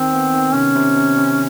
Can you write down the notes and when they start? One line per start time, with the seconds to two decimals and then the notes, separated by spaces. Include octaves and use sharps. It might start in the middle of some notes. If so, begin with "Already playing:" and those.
Already playing: D#3 C4
0.13 B3
0.34 D#3
0.54 C3 C#4
0.75 C3
0.96 C3
1.17 C3